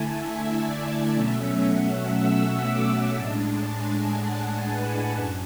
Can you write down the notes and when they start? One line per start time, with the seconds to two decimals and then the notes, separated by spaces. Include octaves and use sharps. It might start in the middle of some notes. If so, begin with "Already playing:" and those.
Already playing: D3 A3 E4 G#5 A5
0.13 E5
0.64 D5
1.13 B2 F#3 A3 C#4 E5
1.64 F#5
2.14 E6
2.64 D6
3.14 A2 G#3 D4 A5
3.65 G#5
4.15 F#5
4.66 B4
5.15 F#2